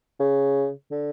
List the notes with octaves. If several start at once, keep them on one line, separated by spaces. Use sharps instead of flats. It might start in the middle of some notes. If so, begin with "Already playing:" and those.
C#3
D3